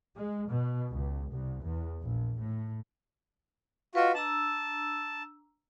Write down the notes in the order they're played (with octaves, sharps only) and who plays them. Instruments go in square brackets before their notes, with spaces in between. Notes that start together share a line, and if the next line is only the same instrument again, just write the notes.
[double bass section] G#3
B2
C#2
C2
E2
A#1
A2
[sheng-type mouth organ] F4 F#4 [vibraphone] B4 D#5
[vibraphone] D4 A#5 E6 [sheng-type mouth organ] A5